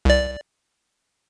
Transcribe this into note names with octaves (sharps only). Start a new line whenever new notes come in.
C2 D5